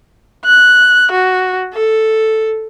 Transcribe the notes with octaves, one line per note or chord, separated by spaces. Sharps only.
F#6
F#4
A4